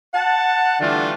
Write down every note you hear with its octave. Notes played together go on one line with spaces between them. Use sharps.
F#5 A5
D3 E3 G3 A3 D4 F4